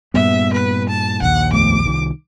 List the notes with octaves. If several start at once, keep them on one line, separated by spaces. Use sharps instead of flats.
G2 A#2 G3 B3 E5
B4
A5
A#1 D#2 F#5
F2 A3 B3 D6
C2 D#3